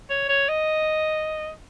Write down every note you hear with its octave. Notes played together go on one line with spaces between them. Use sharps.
C#5
C#5
D#5